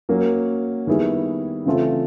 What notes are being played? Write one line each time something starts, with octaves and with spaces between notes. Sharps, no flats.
F#3 A#3 C#4
D#3 G3 B3 E4 G#4
C#3 E3 A3 C4 F4